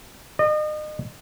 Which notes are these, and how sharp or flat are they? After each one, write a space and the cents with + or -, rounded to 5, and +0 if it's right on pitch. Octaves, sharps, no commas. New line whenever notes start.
D#5 -35